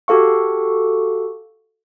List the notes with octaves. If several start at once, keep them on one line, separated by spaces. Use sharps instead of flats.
F#4 G4 A4 F5 C#6